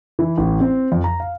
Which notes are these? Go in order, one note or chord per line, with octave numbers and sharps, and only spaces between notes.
E3
A1
C4
F2
A#5
F5